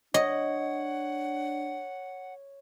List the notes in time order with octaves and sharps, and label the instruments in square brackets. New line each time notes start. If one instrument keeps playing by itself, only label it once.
[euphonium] D4 [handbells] C#5 [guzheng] D#5 [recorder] F#5